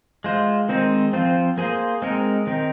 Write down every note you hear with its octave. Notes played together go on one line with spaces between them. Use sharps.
G#3 F4 C5
D#3 G#3 C4 D#4 C5
F3 C4 F4 C5
A#3 G#4 C5
G#3 C4 D#4 A#4
D#3 C4 D#4 A#4